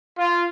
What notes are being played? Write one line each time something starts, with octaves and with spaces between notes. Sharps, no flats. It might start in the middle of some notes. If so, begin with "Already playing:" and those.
F4